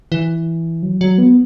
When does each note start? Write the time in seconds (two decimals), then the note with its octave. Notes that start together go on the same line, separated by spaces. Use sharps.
0.12 E3
0.83 F#3
1.01 F#3
1.18 B3